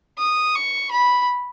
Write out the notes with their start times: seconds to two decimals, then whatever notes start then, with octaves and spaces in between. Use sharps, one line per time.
0.18 D#6
0.55 C#6
0.91 B5